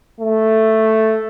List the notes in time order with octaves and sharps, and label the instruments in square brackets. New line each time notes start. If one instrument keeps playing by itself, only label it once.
[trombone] A3